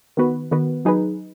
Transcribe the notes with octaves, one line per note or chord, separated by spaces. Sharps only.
D#3 B3 F#4 B4
D#3 B3 F#4 B4
F#3 D#4 G#4 B4